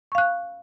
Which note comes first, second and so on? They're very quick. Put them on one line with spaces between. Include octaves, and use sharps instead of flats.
C#6 F5 F#6